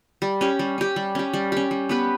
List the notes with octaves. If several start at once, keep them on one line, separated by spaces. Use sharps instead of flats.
G3
C#4 G4
G3
C#4 G4
G3
C#4 G4
G3
C#4 G4
G3
B3 G4 B4